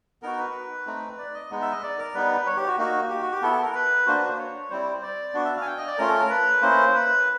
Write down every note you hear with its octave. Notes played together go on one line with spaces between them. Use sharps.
B3 D#4 F#4 A#4
B4
A3 C4 D#4
D5
D#5
G#3 B3 D#4
E5
D#5
D5
A#4
G3 B3 D#4 B4
C#5
G4
F#4
A#3 D#4 F#4
G4
F#4
G4
B3 E4 A4
A4
A#4
B4
A#3 D4 F#4 C5
B4
C5
C#5
G3 C4 E4 C5
D5
B3 D4 F#4
E5
F5
G#5
G5
D#5
D5
A3 C#4 F4 A#4
A4
A#4
B4
A#3 C#4 E4 C5
B4